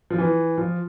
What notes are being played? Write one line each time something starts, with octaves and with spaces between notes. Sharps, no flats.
F3
E3
F3